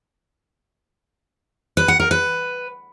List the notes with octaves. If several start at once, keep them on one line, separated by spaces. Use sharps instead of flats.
B4
F#5
A#4
B4